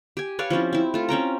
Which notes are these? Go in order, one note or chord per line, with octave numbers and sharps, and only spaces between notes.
G4 G#5
B4 C#5 D5 F5
F3 C4 C#4 E4
C4 E4
A3 F4
C4 C#4 G5 A#5